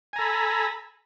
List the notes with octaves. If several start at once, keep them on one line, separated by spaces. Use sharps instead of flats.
A4 G#5 A#5 B5